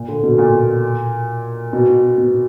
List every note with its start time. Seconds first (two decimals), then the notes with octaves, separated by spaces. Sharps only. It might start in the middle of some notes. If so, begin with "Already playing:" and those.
Already playing: A#2
0.08 D3
0.23 B2
0.38 A#2
1.73 B2
2.18 B2